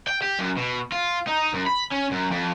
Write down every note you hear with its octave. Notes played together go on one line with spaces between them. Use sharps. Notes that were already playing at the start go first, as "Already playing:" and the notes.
G5
G4
F#2
B2
F4
D#4
F#2
B5
C#4
F#2
F2